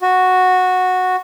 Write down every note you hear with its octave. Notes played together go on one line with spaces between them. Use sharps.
F#4